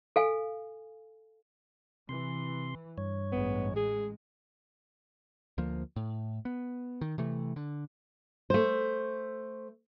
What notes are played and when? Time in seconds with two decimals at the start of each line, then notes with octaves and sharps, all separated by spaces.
0.16 A4 F5 G#5
2.09 C3 E3 C6
2.98 G2 C#5
3.32 A1 G#3 B3
3.76 G#4
5.58 D2 F3 A#3
5.96 A2
6.45 B3
7.01 D#3
7.18 C3 E3 A3
7.56 D3
8.50 A3 C5